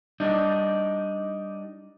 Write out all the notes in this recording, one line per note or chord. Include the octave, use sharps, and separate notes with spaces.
G3 D4 D#4